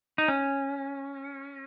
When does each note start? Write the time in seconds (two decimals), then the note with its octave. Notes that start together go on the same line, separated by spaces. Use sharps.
0.18 D#4
0.28 C#4